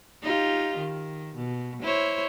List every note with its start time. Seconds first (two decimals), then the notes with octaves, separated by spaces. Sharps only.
0.23 D#4 F4 G4
0.78 D#3
1.35 B2
1.82 E4 C5 C#5